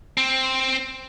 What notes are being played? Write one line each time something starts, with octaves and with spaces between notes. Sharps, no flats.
C4